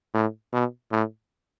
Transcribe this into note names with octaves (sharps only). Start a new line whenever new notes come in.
A2
B2
A2